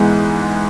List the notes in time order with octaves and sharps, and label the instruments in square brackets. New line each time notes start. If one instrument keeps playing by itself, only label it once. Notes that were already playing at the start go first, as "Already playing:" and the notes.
Already playing: [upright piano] G#2 E3 G#3 B3